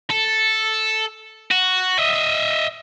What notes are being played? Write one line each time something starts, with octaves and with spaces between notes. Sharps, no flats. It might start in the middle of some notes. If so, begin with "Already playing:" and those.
A4
F#4
D#5 E5